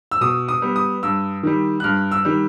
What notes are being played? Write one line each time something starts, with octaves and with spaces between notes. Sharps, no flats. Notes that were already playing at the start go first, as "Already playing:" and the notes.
E6
B2 D#6
D#6
G3 B3
D#6
G2 E6
D#3 G3
F#6
G2 F6
E6
D#3 G3